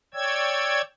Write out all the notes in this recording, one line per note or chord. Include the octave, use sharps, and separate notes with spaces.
C#5 D5 G5 E6 G#6